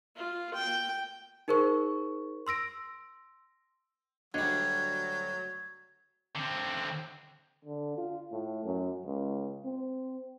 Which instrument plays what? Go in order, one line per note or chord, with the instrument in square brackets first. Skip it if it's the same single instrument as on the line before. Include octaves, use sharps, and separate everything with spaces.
[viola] F4
G5
[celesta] D#4 G#4 A#4 C5 C#6
C6 E6 A#6 D7
[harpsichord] D2 G3 [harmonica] F#3 [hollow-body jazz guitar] D4 C#5 D#5 [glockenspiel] G#6
[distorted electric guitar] D3 C4
[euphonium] D3
F4
A2
F#2
C#2
C4